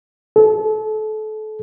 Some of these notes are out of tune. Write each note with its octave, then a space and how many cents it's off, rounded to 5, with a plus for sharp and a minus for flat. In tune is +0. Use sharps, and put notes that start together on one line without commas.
A4 -30